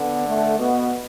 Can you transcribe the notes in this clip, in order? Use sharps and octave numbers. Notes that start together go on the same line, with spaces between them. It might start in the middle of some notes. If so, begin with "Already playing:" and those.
Already playing: D3 B3
A3
B2 B3